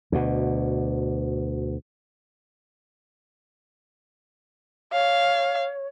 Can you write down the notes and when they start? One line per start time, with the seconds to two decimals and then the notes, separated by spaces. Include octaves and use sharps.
0.12 D2 B2
4.92 C#5 F5